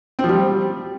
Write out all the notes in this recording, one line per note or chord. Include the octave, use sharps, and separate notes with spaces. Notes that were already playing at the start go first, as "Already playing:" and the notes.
C4
F3
G3